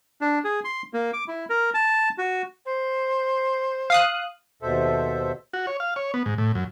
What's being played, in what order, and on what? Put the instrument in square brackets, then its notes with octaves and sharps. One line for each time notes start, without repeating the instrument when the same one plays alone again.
[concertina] D4
G#4
C6
A#3
D6
E4
A#4
A5
F#4
[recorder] C5
[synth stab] F5 D#6 F#6
[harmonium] D#2 B2 A4 C5 E5
[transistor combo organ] F#4
C#5
F5
C#5
B3
G#2
A2
F#2